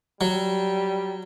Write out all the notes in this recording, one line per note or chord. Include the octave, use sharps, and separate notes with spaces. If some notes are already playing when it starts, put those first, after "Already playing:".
F#3 G3